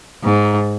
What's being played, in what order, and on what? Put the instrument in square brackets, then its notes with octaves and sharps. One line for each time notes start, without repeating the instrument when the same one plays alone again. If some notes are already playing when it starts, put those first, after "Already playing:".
[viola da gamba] G#2